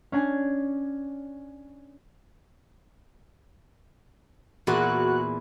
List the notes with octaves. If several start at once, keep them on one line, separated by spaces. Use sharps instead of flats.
C#4 D4 G#5
E2 A#2 E4 F#4 F#6